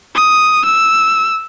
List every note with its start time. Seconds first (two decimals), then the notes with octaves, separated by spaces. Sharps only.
0.15 D#6
0.65 E6